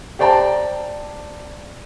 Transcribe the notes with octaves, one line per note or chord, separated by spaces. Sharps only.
G4 C5 D5 G5 A5 A#5